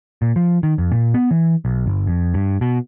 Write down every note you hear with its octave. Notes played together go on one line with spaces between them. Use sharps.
A#2
F3
D#3
F2
A#2
B3
E3
B1
G1
F2
G2
B2